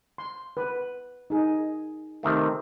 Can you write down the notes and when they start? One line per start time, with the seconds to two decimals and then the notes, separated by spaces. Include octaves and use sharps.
0.18 C6
0.57 B4
1.30 D#4 G#4
2.23 C3 D#3 A3